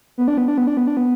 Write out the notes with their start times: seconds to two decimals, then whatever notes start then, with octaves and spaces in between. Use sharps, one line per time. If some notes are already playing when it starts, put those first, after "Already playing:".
0.18 B3
0.28 D4
0.37 B3
0.48 D4
0.58 B3
0.67 D4
0.77 B3
0.87 D4
0.97 B3